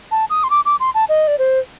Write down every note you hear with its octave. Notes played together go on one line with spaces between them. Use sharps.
A5
D#6
C6
D6
D6
C6
A5
D#5
D5
C5